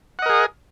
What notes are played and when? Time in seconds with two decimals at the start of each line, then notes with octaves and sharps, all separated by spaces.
0.19 F#5
0.22 D#5
0.26 A#4
0.29 G#4